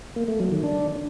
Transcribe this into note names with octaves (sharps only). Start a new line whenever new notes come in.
A#3
A3
F#3
D#3
D4